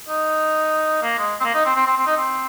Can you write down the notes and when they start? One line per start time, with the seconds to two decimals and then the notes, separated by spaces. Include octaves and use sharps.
0.09 D#4
1.02 A#3
1.18 G#3
1.40 C4
1.44 A#3
1.54 D#4
1.65 C4
1.75 C4
1.86 C4
1.96 C4
2.07 D#4
2.17 C4